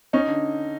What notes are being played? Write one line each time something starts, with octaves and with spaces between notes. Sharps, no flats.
C#4 D#4
D3